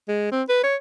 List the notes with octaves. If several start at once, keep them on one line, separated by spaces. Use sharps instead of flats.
G#3
C4
B4
C#5